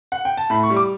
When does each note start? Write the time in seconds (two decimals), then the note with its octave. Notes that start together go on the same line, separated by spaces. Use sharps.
0.12 F#5
0.25 G5
0.37 A5
0.50 A2 B5
0.63 C#6
0.70 G3
0.77 D6